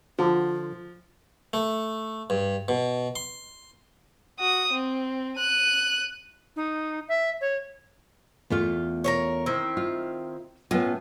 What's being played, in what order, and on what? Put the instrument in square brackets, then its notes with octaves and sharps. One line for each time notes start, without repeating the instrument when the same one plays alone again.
[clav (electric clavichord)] D3 [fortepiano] F3 [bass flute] F4
[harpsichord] A3
G2
B2
C6
[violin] F#4 D#6
C4
F#6 D#7
[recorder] D#4
E5
C#5
[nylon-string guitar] E2 A3 F4
[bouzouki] A#4 C5 C#5
D#3 C4 E4
[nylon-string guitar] F4
[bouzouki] A2 [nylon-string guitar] B3 C#4 F4